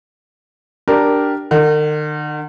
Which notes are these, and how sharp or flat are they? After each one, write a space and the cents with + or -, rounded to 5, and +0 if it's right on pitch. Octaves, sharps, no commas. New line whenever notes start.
D4 +0 G4 -10 A#4 +0
D#3 -45 F#5 -5